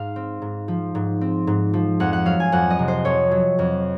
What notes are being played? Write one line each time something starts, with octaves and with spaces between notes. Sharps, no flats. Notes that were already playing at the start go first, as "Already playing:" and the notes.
Already playing: G#2 F5
C4
G#2
F3
G#2
C4
G#2
F3
F2 F#5
F#5
F#3 F5
G#5
F2 F#5
D#5
C3
C5
F2 C#5
F#3
F2